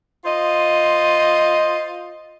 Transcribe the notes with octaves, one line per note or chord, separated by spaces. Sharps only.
F4 C5 D#5